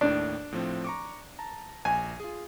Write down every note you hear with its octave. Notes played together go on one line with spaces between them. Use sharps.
D#2 A2 D4
A2 F3 C4
A#5 C#6 D6
A5 A#5
A#1 G#5
F4 G#4